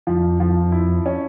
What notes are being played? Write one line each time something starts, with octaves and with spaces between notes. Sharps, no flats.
F2 F3
F3
E4
C#4